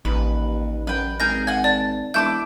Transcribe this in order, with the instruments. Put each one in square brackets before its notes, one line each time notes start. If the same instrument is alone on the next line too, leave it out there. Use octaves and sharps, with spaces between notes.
[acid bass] A1 [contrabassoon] D#2 [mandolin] B4
[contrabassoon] F#2 [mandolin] B4 G5
[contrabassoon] G#1 [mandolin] G#4 A#4 G5 [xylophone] G6 A#6
[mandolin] F#5 G#5
[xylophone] D5 [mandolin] A5
[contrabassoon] E1 [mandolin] E4 C#6 D6 [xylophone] A5 G6